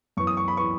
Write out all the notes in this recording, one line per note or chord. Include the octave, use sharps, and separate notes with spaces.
F#2 E3 B3 C#6
D#6
C#6
B5
E3 B3 C#6